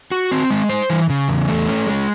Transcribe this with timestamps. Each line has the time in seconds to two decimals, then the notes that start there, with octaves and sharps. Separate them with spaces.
0.11 F#4
0.31 C4
0.50 G#3
0.69 C5
0.90 E3
1.10 C#3
1.28 E2
1.48 A3
1.68 C#4
1.87 G#3